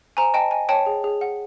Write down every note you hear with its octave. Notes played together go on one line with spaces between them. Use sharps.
C5 G#5 A#5
D#5 G5 A5
D#5 G#5
C#5 G5 A5
G#4
G#4
F#5